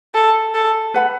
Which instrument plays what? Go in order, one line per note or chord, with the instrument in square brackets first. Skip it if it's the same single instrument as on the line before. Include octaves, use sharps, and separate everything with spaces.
[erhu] A4
A4
[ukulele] B4 F#5 B5